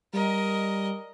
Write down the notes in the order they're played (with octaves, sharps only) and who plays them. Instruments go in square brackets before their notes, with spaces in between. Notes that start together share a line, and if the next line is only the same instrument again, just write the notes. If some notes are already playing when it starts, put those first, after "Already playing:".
[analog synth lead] G3 [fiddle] A#4 D#5